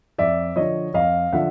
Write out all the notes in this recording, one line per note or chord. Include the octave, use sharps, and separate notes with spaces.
F2 D5 E5
D3 F3 C#5 D#5
F2 D#5 F5
D3 F3 E5 F#5